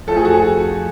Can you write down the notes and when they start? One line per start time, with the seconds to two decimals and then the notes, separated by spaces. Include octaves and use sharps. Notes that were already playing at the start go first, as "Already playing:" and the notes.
0.07 F2 F3 A3 A4
0.17 G#4
0.25 F#4
0.34 G#4